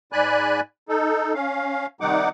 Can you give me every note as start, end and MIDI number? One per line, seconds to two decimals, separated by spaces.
0.12 0.60 44
0.12 0.60 74
0.12 0.60 80
0.12 0.60 83
0.12 0.60 90
0.89 1.33 63
0.89 1.33 69
1.34 1.86 61
1.34 1.86 77
2.01 2.29 48
2.01 2.29 51
2.01 2.29 55
2.01 2.29 63
2.01 2.29 78
2.01 2.29 86